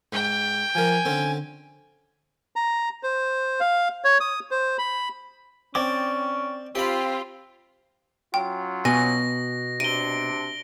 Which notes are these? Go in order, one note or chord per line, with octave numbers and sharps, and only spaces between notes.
G#2 G5
F3 A#4 G#5
D3 C4 C#4
A#5
C5
F5
C#5
D#6
C5
B5
C4 C#4 D5 G5 D6
C4 F4 G4 B5
F#3 C#4 F4 G5
B2 G#5 A#6
C3 D4 D7 D#7 G7